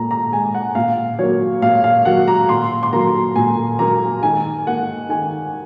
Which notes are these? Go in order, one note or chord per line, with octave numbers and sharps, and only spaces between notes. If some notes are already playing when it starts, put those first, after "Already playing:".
Already playing: A#2 A#5
A#5
G#3 G#5
F#5
A#2 F5
F#3 A#3 C#5
A#2 F5
F5
F#3 A#3 F#5
A#5
A#2 C6
C6
F#3 A#3 A#5
A#2 G#5
F#3 A#3 A#5
D#3 G#5
A#3 F#5
D#3 G#5